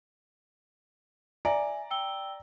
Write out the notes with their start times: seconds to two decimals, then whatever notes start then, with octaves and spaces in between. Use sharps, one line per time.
1.45 D5 E5 G#5 A#5
1.91 G5 E6 G7